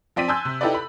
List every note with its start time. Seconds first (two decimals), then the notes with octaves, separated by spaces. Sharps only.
0.16 F3 C4 D5 B6 D#7
0.28 G#5 A5 C6 E6 F#6 G6
0.45 C3
0.61 D#4 E4 G4 A4 B4 D5
0.74 B5